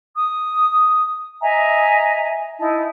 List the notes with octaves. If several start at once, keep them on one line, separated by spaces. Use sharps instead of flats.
D#6
D#5 E5 G#5 A#5
D#4 E4 A5